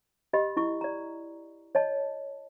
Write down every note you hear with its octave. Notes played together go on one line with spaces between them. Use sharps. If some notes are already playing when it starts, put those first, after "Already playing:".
G4 D#5 B5
E4 C#6
D5 A#5
C#5 D#5 A5